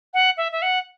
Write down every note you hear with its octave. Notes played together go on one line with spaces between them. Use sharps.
F#5
E5
E5
F#5